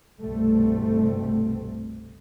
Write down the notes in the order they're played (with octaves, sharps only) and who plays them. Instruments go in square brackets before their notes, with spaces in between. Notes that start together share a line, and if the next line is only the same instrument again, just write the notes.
[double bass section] G1 C2 B2 G3 A3 C4